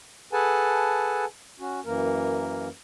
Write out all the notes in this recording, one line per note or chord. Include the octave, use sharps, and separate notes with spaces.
G#4 A4 B4 F#5 G#5 A5
C#4 F#4
F#2 E3 A#3 A#4